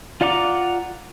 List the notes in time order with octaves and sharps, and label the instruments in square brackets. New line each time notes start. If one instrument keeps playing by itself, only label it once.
[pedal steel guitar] F4 D5 F#5 A#5 D6